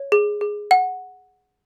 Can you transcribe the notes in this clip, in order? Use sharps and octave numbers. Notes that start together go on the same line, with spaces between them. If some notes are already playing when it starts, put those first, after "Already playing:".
Already playing: C#5
G#4
G#4
F#5